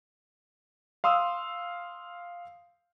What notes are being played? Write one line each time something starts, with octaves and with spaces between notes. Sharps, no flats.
F5 C6 D#6 E6